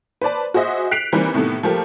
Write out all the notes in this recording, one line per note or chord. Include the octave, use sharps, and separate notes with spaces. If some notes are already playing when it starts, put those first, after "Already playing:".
B4 C5 D5 A5
F#4 G#4 C5 D#5 E5
F#6 B6 C7 D7 F7
D#3 E3 G3 A#3 C4 B4
A2 C3 D#3 A3 B3
F3 A3 A#3 G4